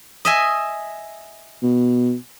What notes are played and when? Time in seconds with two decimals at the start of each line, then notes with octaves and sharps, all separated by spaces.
0.25 D#5 E5 G#5
1.63 B2